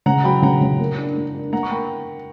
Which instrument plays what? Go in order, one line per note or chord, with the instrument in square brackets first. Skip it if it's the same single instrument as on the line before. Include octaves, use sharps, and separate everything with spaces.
[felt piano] C#3 [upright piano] F#5 A#5
[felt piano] F#3 [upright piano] G5 B5
[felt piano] C#3 [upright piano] F#5 A#5
[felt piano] C#3
A#3
D4
A#3
D4
[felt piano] A#3 [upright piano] F#5 A#5
[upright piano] C#6
[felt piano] A#3 [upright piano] G5 B5